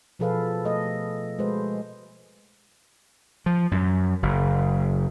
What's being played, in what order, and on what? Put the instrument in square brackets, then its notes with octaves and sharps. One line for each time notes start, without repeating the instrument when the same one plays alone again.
[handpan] B2 F3 G#4 A4 B4 F5
A3 A4 D#5
G#3 F#4 B4 C5
[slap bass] F3
F#2
F#1